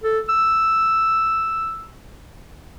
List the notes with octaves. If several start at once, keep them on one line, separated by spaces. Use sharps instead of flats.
A4
E6